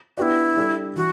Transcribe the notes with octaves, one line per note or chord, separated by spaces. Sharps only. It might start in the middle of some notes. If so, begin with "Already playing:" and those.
B3 D4 E4 F#4 G4 B4 D5
G3 D4 A4 D5
E3 F#4